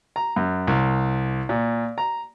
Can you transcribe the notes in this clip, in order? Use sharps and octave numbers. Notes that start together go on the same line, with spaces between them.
A#5
F#2
C2
A#2
A#5